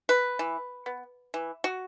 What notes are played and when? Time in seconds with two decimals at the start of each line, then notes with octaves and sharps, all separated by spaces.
0.09 B4
0.39 E3
0.86 B3
1.34 E3
1.64 F#4